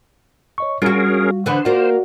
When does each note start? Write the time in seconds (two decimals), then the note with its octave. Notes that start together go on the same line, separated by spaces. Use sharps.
0.58 C#5 D#5 C#6
0.82 G3 C#4 F4 F#4 G#4 A#4
1.46 D3 E3 B3 C5
1.65 A#3 F4 F#4 D5 F#5